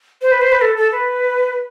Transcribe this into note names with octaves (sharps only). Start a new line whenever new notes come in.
C5
B4
C5
B4
A4
A4
B4